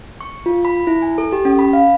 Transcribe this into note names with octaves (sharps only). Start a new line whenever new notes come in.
C#6
F4
B5
E4
G#5
A4
G4
C#4
B5
F5